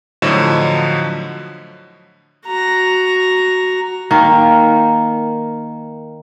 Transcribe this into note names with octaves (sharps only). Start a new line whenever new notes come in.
A2 D3 F3 F#3 D#5 E7
F#4 A#5
D#3 A#3